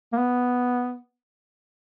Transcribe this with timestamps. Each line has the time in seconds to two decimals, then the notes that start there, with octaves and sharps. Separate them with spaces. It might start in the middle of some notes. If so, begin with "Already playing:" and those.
0.13 A#3
0.18 B3